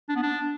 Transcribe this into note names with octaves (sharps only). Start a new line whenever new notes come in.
D4
B3
D4